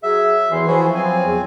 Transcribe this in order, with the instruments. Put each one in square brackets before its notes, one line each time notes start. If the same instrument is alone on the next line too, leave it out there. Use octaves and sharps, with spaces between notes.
[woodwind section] F#3 G#4 [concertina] E5
[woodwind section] E2 C6 [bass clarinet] E3
[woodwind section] F3 [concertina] E4 F#4 G#4
[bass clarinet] F#3 [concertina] C4 G#5
[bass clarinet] E2